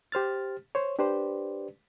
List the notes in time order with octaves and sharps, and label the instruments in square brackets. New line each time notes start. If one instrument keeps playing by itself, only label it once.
[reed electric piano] G4 C5 F6 A6
C5 C#5
D4 G4 B4 C5 D5